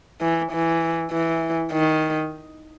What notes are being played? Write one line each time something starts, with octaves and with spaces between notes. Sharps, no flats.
E3
E3
E3
D#3